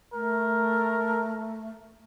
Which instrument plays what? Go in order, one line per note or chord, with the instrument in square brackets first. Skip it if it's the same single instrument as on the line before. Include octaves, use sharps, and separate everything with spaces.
[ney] A3 [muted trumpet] A#4